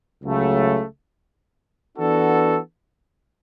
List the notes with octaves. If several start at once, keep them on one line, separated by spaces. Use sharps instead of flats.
C#2 C#3 F#3 A3
E3 B3 D4 F#4 A4